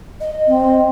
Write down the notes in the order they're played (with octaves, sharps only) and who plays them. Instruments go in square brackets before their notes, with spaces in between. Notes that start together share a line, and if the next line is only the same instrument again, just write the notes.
[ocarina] D#5
[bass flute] C4